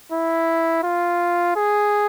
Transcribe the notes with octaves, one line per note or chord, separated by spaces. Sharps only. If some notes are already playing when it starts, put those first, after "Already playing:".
E4
F4
G#4